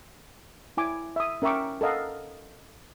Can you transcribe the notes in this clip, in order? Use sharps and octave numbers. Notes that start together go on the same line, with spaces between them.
E4 G#5 D6
E5 D#6
C#4 A#4 E5 G5 C#6 D6
A4 A#4 D#5 F5 F#5